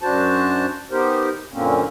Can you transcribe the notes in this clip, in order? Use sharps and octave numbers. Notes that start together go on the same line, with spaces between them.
F#2 D4 F#4 C5 A5
B3 D#4 G4 A#4 C5
F#2 A#2 D3 A#3 C4 C#4